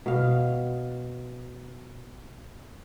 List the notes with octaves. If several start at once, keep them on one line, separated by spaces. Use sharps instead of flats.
B2 F5